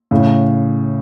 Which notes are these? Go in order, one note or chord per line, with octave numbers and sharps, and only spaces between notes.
A2 C#3